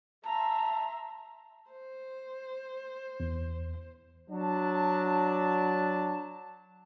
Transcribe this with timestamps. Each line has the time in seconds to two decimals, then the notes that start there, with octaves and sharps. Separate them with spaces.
0.25 E5 A5 A#5 C6
1.71 C5
3.20 E2
4.30 F#3 D4 A5